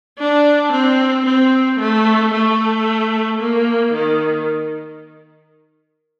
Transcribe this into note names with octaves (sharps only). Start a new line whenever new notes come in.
D4
C4
C4
A3
A3
A#3
D#3